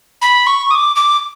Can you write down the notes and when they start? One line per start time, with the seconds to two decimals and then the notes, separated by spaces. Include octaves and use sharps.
0.22 B5
0.47 C#6
0.71 D#6
0.75 D6
0.96 D6